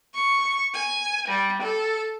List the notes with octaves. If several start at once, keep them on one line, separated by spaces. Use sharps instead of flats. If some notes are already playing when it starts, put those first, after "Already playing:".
C#6
G#5
G3
A4